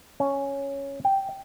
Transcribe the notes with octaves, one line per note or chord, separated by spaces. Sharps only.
C#4
G5